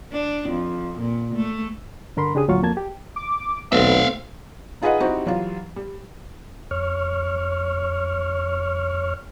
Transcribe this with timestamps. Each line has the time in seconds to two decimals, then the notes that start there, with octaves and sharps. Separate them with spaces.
0.12 D4
0.49 F2
0.99 A#2
1.35 A3
2.17 G2 D3 A#4 B5 C6
2.35 C#3 D4 G4 G#4 D#6
2.48 D2 A#2 F#3 F4 F5 C#6
2.63 F2 A#3 A5 G#6
2.77 G4
3.16 D6
3.72 B1 A3 B3 C4 E5 F5
4.82 D#4 F4 G#4 B4 D#5 F#5
5.00 G3 C4 D#4 E4 F#4 G4
5.26 E3 F#3 G3 F4
5.76 G3
6.71 F2 C#5 C#6 F6